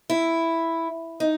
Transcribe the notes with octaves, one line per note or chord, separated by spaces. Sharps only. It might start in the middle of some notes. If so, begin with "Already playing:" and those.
E4
D#4